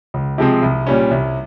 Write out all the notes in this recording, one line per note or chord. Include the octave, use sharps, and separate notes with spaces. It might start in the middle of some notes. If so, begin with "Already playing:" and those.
C#2
C3 F3 G#3 C4
C2
A#2 G3 C#4
C2